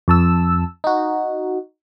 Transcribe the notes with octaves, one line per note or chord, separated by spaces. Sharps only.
F2 A5 E6
D#4 F#4